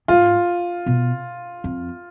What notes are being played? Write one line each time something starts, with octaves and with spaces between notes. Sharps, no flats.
G#2 F4
B2
F2